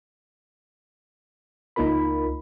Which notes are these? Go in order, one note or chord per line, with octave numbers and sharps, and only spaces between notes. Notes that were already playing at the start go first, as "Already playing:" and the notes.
C#2 A#3 D#4 F4 A#4 B5